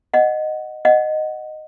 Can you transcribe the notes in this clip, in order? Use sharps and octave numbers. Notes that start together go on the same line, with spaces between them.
D#5 F#5
D#5 F#5